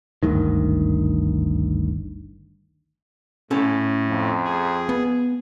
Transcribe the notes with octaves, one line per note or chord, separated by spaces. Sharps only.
G#1 D2 G2 D#3
A2 C#4 A4 A5
F2
G#4
B3